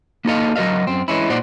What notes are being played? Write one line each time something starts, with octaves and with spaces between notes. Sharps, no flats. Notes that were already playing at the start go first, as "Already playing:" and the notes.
A#3 D#4 F#4 A4 D#5 F5
F#3 F#4 A#4 D#5 F5
F#2 C4
E3 G#3 C#4 E4
A#2 D#4 C5 D5 F#5